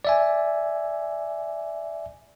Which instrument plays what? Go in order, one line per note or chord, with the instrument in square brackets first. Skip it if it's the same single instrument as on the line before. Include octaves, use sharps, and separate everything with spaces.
[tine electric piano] D5 E5 G#5